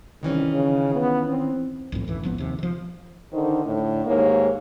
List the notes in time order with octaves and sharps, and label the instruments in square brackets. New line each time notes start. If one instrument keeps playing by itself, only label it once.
[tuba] C2 [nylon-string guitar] D#3 E3 C#4
[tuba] C#3
B3
C4
[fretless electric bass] B1 F2 A2
A1 D2 E3
G#1 F3 B3
D#2 C3
D#3 F3
[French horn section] D3 D#3 D#4 C5
A2 D3
D#2 G#2 A#3 C#5